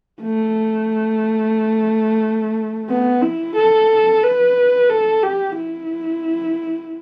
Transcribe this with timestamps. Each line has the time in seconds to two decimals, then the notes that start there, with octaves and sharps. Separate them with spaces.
0.22 A3
2.89 B3
3.22 E4
3.56 A4
4.23 B4
4.90 A4
5.23 G4
5.56 E4